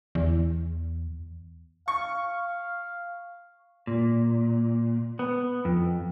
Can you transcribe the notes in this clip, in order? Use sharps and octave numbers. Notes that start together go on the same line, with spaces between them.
E2
F5 C#6
A#2
B3
F2